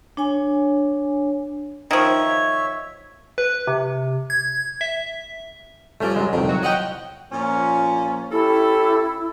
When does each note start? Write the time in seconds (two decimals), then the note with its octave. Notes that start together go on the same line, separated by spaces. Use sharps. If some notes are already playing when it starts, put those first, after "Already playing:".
0.17 D4 C#5 G#5
1.91 D#3 F3 C#5 E5
3.38 B4
3.67 C3
4.30 G#6
4.81 E5
6.00 G2 F3 A3 C#4 D5
6.16 F#3 G#3
6.33 C2 F2 A#2 D#3
6.49 F#3 F#4
6.63 F3 C#4 D#5 F#5 G5
7.32 A#2 F3 C#4
8.32 C#4 E4 G4 A4